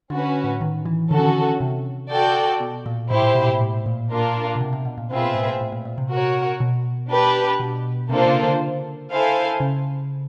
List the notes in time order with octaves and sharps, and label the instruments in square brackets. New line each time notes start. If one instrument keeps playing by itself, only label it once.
[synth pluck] D3 [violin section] C#4 F#4 B4
[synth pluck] A2
D#3
E3
[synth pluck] D3 [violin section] C#4 F#4 A4
[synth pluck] D#3
D3
C3
[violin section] F#4 A4 D5 G5
[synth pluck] B2
A#2
[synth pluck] A2 [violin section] E4 G4 C5
[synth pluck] A#2
B2
A2
A2
A#2
[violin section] A#3 D4 F4 A#4
[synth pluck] B2
C3
C3
B2
A#2
[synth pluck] B2 [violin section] C4 F4 G#4 B4 E5
[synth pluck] A#2
A2
A#2
A2
A#2
A#2
C3
[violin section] F#4 A#4 C#5
[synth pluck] B2
[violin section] D4 G4 B4
[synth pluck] B2
[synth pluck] C3 [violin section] A#3 D4 F4 A4 C5
[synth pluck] C#3
D3
[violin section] E4 A4 C5 F5 G#5
[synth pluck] C#3